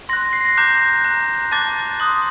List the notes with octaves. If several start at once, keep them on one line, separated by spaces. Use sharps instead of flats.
C6 F#6 A#6
C7
A#6
A#5 D6 F#6 G6
A#5 F#6
A5 D6 F#6 A6
C6 D#6 F#6